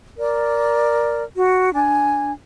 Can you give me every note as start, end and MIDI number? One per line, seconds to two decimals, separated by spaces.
0.18 1.22 70
0.18 1.22 74
1.37 1.73 66
1.74 2.32 62
1.74 2.32 80